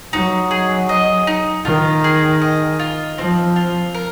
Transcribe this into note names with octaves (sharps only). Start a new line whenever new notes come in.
F#3 D#4
G#4
D#5
D#4
D#3 F4
G#4
D#5
F4
F3 C4
F4
A#4